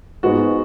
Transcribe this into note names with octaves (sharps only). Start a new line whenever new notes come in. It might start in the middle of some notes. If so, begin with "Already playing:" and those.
G#2 G#3 B3 F#4